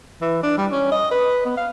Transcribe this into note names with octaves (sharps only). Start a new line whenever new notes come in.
E3
D4
G3
C#4
D#5
B4
B3
F5